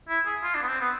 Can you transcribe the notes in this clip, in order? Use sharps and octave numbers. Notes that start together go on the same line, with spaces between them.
E4
G#4
F4
D4
B3
C4
B3